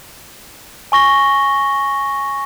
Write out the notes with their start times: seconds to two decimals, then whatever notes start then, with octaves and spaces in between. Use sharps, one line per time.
0.92 G#5 C#6 A#6 G7